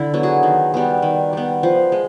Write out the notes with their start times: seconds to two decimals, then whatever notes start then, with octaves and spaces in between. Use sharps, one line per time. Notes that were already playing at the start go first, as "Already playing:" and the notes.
Already playing: D3 E4
0.14 F#3 B3
0.23 F#4 G#4
0.43 D#3
0.74 G3 B3
1.02 D#3
1.33 G3 B3
1.63 F3
1.92 G#3